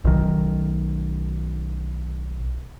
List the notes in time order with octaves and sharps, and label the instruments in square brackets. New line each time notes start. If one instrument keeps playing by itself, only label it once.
[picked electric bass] B1 D#3